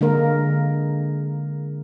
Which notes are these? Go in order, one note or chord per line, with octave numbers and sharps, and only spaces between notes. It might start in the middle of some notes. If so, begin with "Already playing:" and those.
D3 G#3 A#3 A#4